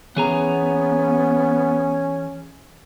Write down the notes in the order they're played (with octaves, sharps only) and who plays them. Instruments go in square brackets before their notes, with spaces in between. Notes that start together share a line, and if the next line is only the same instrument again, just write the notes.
[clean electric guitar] E3 G#4 A#5 [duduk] B3 [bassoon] C#4